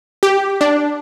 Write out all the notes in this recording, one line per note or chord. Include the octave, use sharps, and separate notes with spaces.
G4
D4